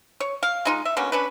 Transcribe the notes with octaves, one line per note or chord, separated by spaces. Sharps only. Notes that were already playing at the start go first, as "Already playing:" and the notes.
C#5
F5
G#3 D#4 F4
E5
B2 D3 A#3 C#4
C#4 D4 B4